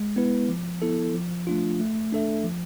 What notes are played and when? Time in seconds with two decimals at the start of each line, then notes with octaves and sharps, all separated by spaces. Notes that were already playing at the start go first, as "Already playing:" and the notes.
Already playing: G#3
0.16 B3 E4 B4
0.49 F3
0.82 B3 E4 A4
1.14 F3
1.47 A3 D4 F4
1.79 A3
2.12 D4 A4 E5
2.44 F3